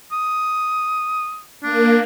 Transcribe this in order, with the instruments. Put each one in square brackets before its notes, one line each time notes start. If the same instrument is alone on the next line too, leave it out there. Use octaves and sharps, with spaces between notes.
[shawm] D#6
[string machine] A#3 [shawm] D4